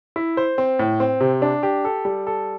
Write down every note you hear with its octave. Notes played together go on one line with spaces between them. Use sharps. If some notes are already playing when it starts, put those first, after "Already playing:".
E4
C5
C4
A2
C4
C3
D4
G4
A4
G3
A4